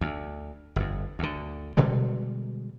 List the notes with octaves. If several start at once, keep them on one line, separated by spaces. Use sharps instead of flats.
D2
G1 F2
D2 D3
B2 D3 G3 G#3